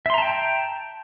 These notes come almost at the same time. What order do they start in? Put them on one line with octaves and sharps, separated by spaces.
E5 C6 A#5 A5 G5